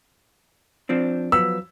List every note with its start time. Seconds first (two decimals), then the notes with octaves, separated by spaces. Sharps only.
0.89 F3 C4 D4
1.32 F3 F#3 B3 E6